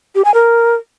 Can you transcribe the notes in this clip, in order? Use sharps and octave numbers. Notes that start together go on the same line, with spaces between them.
G4
G#5
A#4